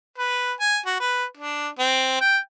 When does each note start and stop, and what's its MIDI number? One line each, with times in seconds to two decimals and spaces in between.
0.18 0.53 71
0.60 0.78 80
0.86 0.96 66
1.00 1.24 71
1.37 1.68 62
1.79 2.18 60
2.21 2.38 79